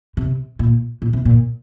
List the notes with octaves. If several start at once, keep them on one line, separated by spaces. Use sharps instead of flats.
C3
A#2
A#2
C3
A#2